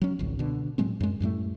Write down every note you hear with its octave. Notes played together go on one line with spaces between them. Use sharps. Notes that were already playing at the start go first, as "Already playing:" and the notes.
F#3 C#4
G#1 C#2
B2 D3
A2 F#3 G#3 C4
F#2 G#3
F#2 A2 G3 A3